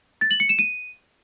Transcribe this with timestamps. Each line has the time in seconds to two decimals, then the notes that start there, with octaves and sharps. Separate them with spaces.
0.21 A6
0.31 F#7
0.40 C#7
0.49 E7
0.59 D#7